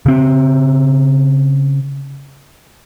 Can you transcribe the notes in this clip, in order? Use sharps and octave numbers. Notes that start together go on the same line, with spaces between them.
C#3 C4